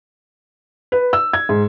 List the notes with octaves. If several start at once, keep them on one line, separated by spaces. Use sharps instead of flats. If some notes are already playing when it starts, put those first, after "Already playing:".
B4
E6
G#6
G#2